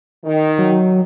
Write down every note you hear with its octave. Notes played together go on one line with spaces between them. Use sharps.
D#3
F#3